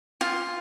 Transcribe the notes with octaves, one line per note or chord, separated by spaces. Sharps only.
F4